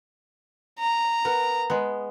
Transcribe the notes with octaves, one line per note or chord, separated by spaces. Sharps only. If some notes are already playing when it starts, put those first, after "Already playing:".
A#5
B3 A#4
G#3 B3